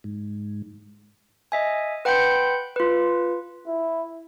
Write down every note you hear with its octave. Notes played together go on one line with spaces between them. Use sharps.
G#2
D#5 E5 G#5
B4 F#5 G5 B5 C6 G6
F4 B4
E4